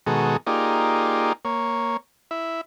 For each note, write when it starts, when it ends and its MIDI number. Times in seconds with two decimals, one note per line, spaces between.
0.07 0.37 47
0.07 0.37 51
0.07 0.37 56
0.07 0.37 66
0.07 0.37 68
0.07 0.37 69
0.47 1.33 58
0.47 1.33 63
0.47 1.33 65
0.47 1.33 67
0.47 1.33 68
0.47 1.33 74
1.45 1.97 58
1.45 1.97 73
2.31 2.61 64
2.31 2.61 76